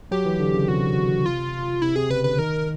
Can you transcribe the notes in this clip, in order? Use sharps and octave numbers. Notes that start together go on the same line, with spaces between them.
F#3 G4
E3
D3
C#3
C3 F#4
F4
C3 E4
C3 G#4
C#3 B4
D3 B4
D#3 A#4